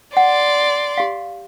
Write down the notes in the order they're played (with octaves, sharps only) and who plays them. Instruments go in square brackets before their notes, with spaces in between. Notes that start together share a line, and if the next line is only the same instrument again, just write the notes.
[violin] D5 C6 [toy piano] F#5
[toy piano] G4 F5